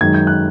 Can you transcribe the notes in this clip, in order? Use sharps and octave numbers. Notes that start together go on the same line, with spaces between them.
F#2 D#3 G#3 G#6
G6
F#6